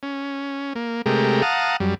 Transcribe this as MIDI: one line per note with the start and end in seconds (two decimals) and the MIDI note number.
0.03 0.73 61
0.75 1.02 58
1.06 1.42 48
1.06 1.42 56
1.06 1.42 57
1.06 1.42 67
1.06 1.42 70
1.42 1.76 77
1.42 1.76 78
1.42 1.76 81
1.42 1.76 82
1.42 1.76 87
1.80 1.94 42
1.80 1.94 55